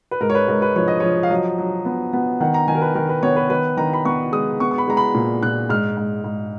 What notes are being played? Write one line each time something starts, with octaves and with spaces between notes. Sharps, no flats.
B4
G#2 A#4
C#5
B4
G#2 A#4
B4
F3 C#5
D#5
F3 C#5
F5
F#3 D#5
F#3
B3
B3
D#3 F#5
A#5
D#3 G#5
A#4
B4
D#3 A#4
B4
B3 C#5
B4
D#3 B4
D#3 A#5
B5
B3 C#6
G#3 D#6
B3 C#6
C#6
B5
G#3 A#5
B5
A#2
A#2 F#6
G#2 F6
G#2
G#2